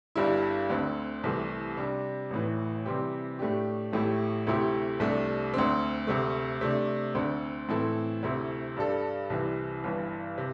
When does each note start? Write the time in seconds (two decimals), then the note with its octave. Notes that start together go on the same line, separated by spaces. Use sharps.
0.16 G1 G2 D3 G3 E4
0.70 D2 D3 C4
1.24 C2 C3 E3 A3
1.77 C3 G3 D4
2.31 A1 A2 E3
2.85 C3 E3 G3 C4 G4
3.39 A2 A3 D4 G4
3.93 A1 A2 A3 E4 G4
4.47 D2 C3 A3 E4 G4
5.00 C2 C3 A3 D4
5.54 D2 D3 C4
6.07 D2 C3 A3
6.61 C3 A3 D4
7.15 D2 D3 C4
7.69 A2 E3 C4 E4 A4
8.23 D2 C3 A3 C4 E4
8.77 G2 G3 D4 A4
9.30 C2 C3 E3
9.84 G1 G2 E3
10.38 C3